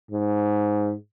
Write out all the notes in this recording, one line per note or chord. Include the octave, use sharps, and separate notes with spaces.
G#2